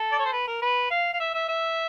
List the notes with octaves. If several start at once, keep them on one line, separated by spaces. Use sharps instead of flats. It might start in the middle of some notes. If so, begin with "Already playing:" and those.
Already playing: A4
D5
C#5
C5
B4
A#4
B4
F5
F5
E5
E5
E5